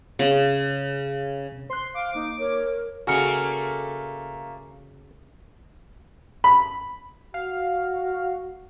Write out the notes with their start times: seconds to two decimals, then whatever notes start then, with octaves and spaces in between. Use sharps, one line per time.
0.19 C#3
1.52 D#2 C3
1.70 C5 C6 F#6
1.95 F5 D6
2.15 A#3 D#4
2.39 A#4 C#5
3.07 C#3 A3 A#3 F#4 G#5 F6 C#7
6.44 B5
7.34 F#4 F5